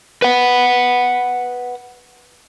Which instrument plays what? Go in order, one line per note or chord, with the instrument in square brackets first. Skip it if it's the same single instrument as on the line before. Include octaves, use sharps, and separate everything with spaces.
[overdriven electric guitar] B4 F#5